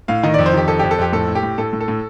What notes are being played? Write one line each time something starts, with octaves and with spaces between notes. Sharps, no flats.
A2 F5
D#3 D#5
F2 D5
C5
D#3 G4
F2 A4
F2 G4
A4
F2 G4
A2 A4
A2
G4
A2
A2 A4
A2
A4
A2